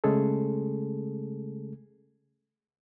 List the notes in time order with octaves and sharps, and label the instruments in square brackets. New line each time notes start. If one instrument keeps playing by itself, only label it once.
[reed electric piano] C#3 G#3 A3 C#4 G#4 A4